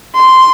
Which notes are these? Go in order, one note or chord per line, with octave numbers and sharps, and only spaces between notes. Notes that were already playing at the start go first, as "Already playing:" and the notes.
C6